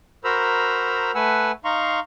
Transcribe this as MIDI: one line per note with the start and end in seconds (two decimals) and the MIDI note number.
0.24 1.11 66
0.24 1.11 70
0.24 1.11 72
0.24 1.11 82
0.24 1.11 83
0.24 1.11 88
1.15 1.52 57
1.15 1.52 71
1.15 1.52 78
1.15 1.52 80
1.15 1.52 88
1.65 2.00 63
1.65 2.00 77
1.65 2.00 82
1.65 2.00 84
1.65 2.00 85